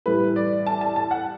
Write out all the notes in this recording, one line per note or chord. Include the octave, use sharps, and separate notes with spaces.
A2 E3 G3 B4
D5
A5
A5
A5
F#5